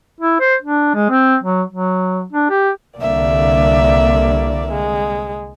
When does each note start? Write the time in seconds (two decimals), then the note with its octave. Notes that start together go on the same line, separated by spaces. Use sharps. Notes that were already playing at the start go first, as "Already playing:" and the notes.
0.21 E4
0.40 C5
0.62 D4
0.95 G#3
1.10 C4
1.44 F#3
1.71 F#3
2.33 D4
2.50 G4
2.98 C2 D3 A#3 D5 E5
4.72 G#3